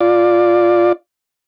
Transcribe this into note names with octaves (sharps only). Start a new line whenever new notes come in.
F4 D5